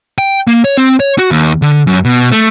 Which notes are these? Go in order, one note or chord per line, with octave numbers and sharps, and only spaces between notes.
G5
A#3
C#5
C4
C#5
F#4
D#2
D3
F#2
B2
A3